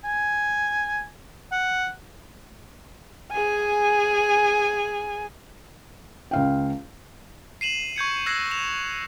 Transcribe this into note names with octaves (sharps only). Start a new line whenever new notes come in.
G#5
F#5
G#4 G#5
C#2 F5 G5
C7 D#7 E7 F#7
C#6 G6 G#6 C#7
E6 F#6 G#6 A#6 C7
E7 F7